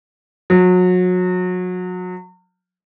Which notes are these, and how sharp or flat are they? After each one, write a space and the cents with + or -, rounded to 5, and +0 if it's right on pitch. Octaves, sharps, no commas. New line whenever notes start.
F#3 -30